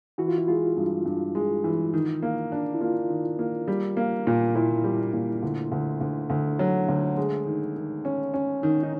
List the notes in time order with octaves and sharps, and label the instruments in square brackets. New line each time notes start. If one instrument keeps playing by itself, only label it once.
[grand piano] E3 [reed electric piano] F#4
[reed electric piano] F4
E4
[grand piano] G#3 [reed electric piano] F4
[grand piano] G2
G2
G#3
E3
D#3
A#3
D4
[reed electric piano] E4
[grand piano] A#3 [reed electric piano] F4
[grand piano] D#3
A#3
G3
A#3
A#2
[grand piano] A#2 [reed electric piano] E4
[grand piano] G3
A#2
D2
D2
D2
[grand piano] D2 [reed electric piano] D4
[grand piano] F#3
D2
G#3
D#3
D#3
C#4
C#4
D#3
[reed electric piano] D#4